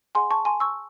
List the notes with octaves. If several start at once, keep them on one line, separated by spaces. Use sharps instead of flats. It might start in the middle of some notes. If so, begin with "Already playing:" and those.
G#4 D#5 F#5 G#5 C6
A5 C#6
G#5 C6
C#6 E6